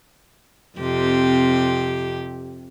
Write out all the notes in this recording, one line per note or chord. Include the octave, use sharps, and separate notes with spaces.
F2 C3 G4